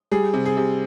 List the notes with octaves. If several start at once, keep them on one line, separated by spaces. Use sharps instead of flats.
G3 G#4
C3
G#4
C3